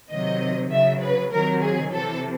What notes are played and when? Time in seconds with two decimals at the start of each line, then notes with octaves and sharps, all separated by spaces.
0.10 C3 D#3 F#3 D#5
0.71 C#3 F#3 E5
1.01 B4
1.32 C3 D#3 F#3 A#4
1.62 G#4
1.92 C3 E3 A4